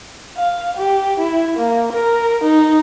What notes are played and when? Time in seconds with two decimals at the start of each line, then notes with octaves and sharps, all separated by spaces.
0.37 F5
0.77 G4
1.19 E4
1.57 A#3
1.92 A#4
2.44 D#4